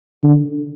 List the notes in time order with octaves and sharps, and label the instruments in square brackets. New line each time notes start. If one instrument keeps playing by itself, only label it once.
[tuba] D3